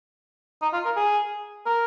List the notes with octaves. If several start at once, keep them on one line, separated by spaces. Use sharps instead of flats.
D#4
F4
A#4
G#4
A#4